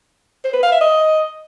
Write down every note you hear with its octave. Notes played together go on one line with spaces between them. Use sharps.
C5
B4
F5
E5
D#5